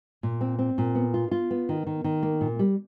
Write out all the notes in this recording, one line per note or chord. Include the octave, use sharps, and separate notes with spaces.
A#2
C4
C4
A#2
B3
F4
F4
B3
D#3
D#3
D#3
A#3
A#2
G3